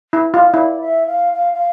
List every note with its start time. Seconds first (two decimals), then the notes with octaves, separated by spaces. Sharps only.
0.13 E4
0.34 F4 D#5
0.54 E4 D5
0.80 E5
1.06 F5
1.33 F5
1.53 F5